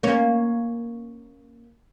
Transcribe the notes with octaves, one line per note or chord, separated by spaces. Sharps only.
A#3 C#4